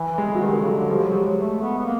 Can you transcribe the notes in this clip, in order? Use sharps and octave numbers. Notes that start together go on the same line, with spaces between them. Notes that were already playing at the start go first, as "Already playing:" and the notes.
Already playing: E3
G#3
F#3
D#3 G3
D3
C#3 F#3
D3
F3 G3
F#3 G#3
G3
A3
B3
B3
A#3